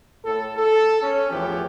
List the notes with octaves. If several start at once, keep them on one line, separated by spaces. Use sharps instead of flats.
A2 A4
A4
C#4
E2 A2 E3 F3 B3 G4